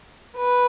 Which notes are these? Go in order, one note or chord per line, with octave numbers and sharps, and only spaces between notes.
B4